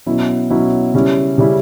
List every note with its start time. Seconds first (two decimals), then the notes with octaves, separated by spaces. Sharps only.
0.06 B2 F#3 C#4 E4
0.50 B2 F#3 C#4 E4
0.94 C#3 G3 C#4 E4
1.38 C#3 G3 C#4 E4